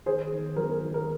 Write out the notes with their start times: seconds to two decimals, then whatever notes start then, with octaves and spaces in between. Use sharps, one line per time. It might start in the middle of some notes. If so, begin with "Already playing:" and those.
0.06 D#3 G#4 C5
0.32 D#3
0.56 F#3 A#4
0.70 A#4
0.82 D#3
0.94 A#4